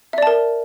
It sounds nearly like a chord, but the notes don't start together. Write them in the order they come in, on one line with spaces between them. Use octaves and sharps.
E5 D5 A5 A#4